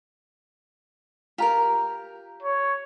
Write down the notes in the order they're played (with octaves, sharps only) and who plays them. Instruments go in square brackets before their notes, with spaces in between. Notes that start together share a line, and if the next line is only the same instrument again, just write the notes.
[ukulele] F4 A#5 [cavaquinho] G4 A#4
[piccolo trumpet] C#5